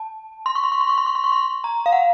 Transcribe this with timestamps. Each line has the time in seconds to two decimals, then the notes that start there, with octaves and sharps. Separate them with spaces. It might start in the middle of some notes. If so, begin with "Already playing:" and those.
Already playing: A5
0.46 C6
0.55 C#6
0.63 C6
0.72 C#6
0.81 C6
0.89 C#6
0.98 C6
1.06 C#6
1.15 C6
1.24 C#6
1.32 C6
1.64 A#5
1.86 F5
1.92 F#5